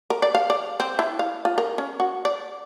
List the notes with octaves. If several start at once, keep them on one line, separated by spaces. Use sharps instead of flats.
A#4
D5
F5
D5
C4
E4
F5
F4
A#4
C#4
F#4
D5